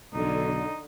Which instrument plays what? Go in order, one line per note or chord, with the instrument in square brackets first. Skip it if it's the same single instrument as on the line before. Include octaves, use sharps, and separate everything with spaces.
[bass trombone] B1 [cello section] D3 [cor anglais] D#4